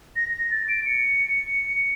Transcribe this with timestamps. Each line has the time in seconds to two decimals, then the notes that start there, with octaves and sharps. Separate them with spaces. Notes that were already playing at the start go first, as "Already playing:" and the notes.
0.16 A#6
0.33 A#6
0.51 A6
0.68 D7
0.86 C#7